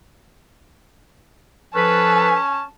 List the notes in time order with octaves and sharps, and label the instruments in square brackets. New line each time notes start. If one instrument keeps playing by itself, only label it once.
[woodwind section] F3 A4 B4 [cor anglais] C#4 [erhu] A5